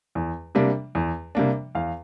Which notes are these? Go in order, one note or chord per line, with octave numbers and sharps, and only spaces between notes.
E2
C3 G3 A#3 D4
E2
C3 G3 A#3 D4
E2 F5